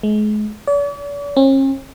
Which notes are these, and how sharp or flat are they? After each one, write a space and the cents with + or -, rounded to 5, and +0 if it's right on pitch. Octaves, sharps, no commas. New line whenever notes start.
G#3 +35
D5 -45
C#4 -45